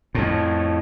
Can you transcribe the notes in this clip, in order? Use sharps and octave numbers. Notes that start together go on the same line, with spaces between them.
F2 A2